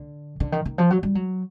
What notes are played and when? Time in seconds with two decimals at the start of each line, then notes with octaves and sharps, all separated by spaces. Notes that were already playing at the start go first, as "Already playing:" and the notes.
Already playing: D3
0.40 D3
0.52 D#3
0.65 D#3
0.78 F3
0.90 F#3
1.03 G3
1.15 F#3